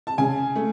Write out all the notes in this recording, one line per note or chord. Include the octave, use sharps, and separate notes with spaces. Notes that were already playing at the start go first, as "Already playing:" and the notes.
A5
C#3 G#5
A3